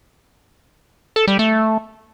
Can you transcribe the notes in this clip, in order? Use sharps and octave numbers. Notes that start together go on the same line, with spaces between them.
A4
G3
A3